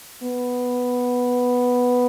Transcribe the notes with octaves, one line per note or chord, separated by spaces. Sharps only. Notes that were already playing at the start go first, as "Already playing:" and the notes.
B3